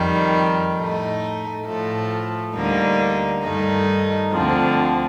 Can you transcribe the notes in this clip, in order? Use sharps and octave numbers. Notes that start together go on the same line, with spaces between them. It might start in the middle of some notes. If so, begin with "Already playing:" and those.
Already playing: F2 D#3 G3
A2 A3 D#4
A2 F3 A3
D2 D3 G3 A#3 D#4
G2 D#3 A3 D#4
D2 D3 F3 C4